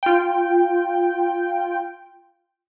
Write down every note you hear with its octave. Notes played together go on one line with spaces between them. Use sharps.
F4 G5